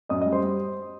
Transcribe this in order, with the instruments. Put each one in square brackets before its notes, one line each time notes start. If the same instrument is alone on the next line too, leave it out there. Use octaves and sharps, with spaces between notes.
[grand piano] F#2 [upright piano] D#5 D#6
[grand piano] G3 [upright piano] D#5 D#6
[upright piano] C5 C6
[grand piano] G3